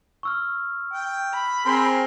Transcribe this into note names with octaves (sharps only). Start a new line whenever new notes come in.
C#6 E6 F6
G5
B5
C4 G#4 A#4 C6